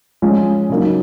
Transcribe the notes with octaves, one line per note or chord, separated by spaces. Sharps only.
F3 G#3 C#4 F4
C#3 F#3 A#3 D#4